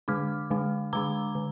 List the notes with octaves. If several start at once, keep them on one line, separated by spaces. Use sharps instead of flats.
D3 G#3 D4 D6 F6
D3 G#3 D4
D3 G#3 D4 A#5 D6
D3